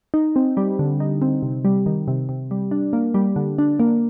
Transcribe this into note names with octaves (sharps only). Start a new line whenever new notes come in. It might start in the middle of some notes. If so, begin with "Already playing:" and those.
D#4
C4
G3
D3
D#4
C4
C3
G3
D#3
C3
C3
G3
D4
A#3
G3
D3
D4
A#3